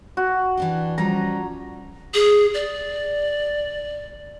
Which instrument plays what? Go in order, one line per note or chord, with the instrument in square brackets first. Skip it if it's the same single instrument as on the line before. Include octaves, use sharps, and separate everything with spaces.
[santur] F#4
[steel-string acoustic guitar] E3 D4 G4
[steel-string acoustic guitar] F3 G3 C#4 [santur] A#5
[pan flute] G#4
D5